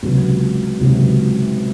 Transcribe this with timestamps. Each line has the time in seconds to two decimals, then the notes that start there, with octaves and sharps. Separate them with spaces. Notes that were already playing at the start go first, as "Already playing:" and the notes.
0.03 C#2 C3 F#3
0.80 C#2 C3 F#3